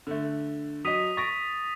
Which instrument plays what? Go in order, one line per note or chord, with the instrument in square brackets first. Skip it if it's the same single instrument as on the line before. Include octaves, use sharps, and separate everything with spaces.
[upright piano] D3 A3
[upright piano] F#3 D#5 [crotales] D#6 B6 D#7
[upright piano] C#6 A#6 D7 [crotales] A6